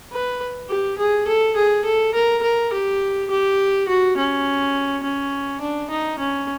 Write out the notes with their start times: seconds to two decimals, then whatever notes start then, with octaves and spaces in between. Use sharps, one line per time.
0.12 B4
0.69 G4
0.98 G#4
1.27 A4
1.56 G#4
1.85 A4
2.14 A#4
2.43 A#4
2.72 G4
3.30 G4
3.88 F#4
4.17 C#4
5.03 C#4
5.61 D4
5.90 D#4
6.19 C#4